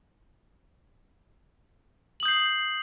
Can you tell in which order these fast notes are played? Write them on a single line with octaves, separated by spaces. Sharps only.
F#7 D#6 G6 C7